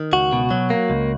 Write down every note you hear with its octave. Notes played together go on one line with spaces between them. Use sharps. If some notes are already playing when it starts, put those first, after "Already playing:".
Already playing: D#3
C#2 F#4
B2
F#3
A#3
C#2